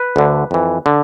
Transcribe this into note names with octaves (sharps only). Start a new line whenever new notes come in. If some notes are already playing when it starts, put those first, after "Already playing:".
Already playing: B4
D2 D3
F2 E3
D3